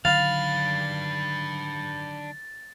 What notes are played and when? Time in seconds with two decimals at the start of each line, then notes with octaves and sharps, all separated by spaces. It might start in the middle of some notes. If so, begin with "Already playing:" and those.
0.05 D3 D#3 F#3 D4 B4 F5 A6